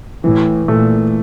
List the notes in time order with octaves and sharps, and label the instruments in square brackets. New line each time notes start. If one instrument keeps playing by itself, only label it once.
[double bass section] A2 [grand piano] E3
[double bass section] A#2 [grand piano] A3